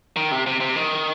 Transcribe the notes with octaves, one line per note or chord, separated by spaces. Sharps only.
D#3
C3
C3
C3
D#3